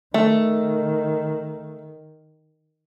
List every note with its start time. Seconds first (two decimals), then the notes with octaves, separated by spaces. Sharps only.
0.14 D#3 A3